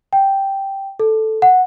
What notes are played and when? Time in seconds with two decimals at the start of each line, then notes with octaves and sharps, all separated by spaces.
0.13 G5
1.00 A4
1.42 F#5